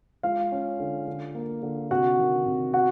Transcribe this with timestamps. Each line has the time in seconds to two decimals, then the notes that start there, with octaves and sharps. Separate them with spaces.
0.23 G#3 F4 F5
0.52 C#4
0.80 D3
1.08 D3
1.35 A#3
1.63 D3
1.91 C3 F#4 F#5
2.19 D#3
2.46 C3
2.74 B3 F#4 F#5